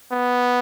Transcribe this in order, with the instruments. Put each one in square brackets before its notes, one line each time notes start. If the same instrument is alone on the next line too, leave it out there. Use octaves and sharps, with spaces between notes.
[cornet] B3